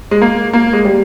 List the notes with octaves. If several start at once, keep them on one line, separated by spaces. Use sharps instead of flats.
G#3
A#3
A#3
G#3
G3